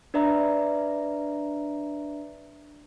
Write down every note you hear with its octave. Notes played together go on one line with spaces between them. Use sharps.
D4 B4 D5 E5 A#5